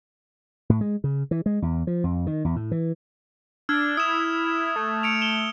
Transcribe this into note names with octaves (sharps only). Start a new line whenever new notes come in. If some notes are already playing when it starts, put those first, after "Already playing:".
A2
G#3
C#3
E3
G#3
E2
F3
F2
D#3
E2
A2
E3
D4 E6 F6 G#6
E4 D#6 E7
A3
C#7 D7 F7
E7 G7